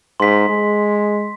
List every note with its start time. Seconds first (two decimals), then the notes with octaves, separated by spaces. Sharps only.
0.20 G#2 C6 B6
0.49 G#3